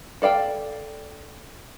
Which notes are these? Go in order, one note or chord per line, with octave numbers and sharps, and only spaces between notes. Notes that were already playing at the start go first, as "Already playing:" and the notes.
A4 D5 F5 G5